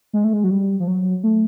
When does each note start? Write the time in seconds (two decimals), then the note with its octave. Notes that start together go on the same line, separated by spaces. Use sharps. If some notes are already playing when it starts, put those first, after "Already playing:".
0.13 G#3
0.24 A3
0.33 G#3
0.44 F#3
0.50 G3
0.80 F3
0.88 F#3
1.24 A3